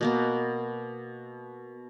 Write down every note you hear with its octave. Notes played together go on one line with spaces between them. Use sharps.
B2 A#3 B3